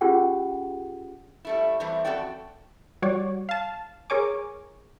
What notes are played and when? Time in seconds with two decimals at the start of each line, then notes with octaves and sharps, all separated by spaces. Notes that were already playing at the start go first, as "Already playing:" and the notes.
0.01 C#4 F4 G4 G#4 F#5 G5
1.45 G3 A3 E4
1.80 E3 G3 A3 C4
2.05 F2 G#2 F#4 A4 D5 G5
3.02 G3 F#4 C#5 D5
3.49 F5 A5
4.10 G#4 A#4 C#5 G#5 D6